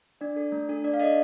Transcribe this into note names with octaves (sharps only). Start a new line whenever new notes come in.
D4 D5
A4
A3
D4 A4
D4 D5
F5
A4 D#5